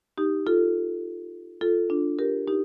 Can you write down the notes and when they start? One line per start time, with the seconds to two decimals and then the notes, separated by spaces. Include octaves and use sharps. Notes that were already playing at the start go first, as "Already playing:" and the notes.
0.18 D#4 G4
0.47 F4 A4
1.61 F4 A4
1.90 D4 F4
2.19 G4 A#4
2.47 D#4 G4